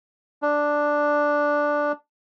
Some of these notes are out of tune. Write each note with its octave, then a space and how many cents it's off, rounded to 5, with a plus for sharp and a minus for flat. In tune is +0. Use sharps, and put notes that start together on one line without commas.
D4 +0